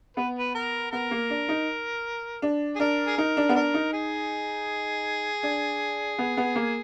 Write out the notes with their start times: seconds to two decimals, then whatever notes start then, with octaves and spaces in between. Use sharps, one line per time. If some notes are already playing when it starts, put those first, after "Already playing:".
0.17 B3 B4
0.38 B4
0.55 A#4
0.92 B3 A#4
1.11 A#3
1.30 D4
1.49 D#4
2.42 D4
2.76 G#4
2.80 D4 A#4
3.06 G#4
3.17 D#4 A#4
3.37 D4
3.49 B3
3.55 D4 A#4
3.74 D#4
3.93 G#4
5.43 D4
6.18 B3
6.37 B3
6.56 A#3